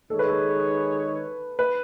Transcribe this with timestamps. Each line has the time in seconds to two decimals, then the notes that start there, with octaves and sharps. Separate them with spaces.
0.10 D#3 G#3 D#4 G#4 A4 C#5
0.19 B4
0.29 A4
1.59 B4